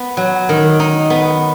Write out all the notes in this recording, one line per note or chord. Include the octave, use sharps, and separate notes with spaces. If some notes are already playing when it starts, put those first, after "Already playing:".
Already playing: B3
F#3
D#3
D#4
B3